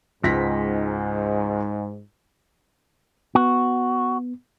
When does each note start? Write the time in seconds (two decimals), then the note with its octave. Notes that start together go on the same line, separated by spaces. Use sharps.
0.23 C#2 G#2 A#6 B6
3.35 B3 F#4